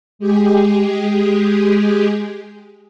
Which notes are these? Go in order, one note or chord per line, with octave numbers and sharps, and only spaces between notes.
G#3 G4 G#4